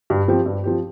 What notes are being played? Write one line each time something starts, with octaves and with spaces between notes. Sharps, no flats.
G2
F3 C4 G4
G2
F3 C4 G4